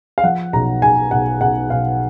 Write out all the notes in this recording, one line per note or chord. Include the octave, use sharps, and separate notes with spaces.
F5
F3 F#5
B1 A#5
B1 G#5
B1 F#5
B1 F#5
B1 F5